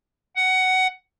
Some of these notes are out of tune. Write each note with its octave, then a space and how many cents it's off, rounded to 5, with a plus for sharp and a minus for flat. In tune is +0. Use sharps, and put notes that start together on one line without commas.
F#5 +15